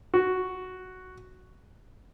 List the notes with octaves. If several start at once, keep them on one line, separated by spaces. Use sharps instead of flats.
F#4